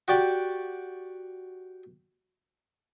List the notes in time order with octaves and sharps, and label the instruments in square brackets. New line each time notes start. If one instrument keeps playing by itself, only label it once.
[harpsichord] F#4 G4 D5 G5